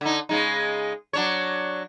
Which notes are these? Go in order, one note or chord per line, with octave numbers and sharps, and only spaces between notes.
D3 D#4
C#3 G#3 D#4
F#3 D4 C#5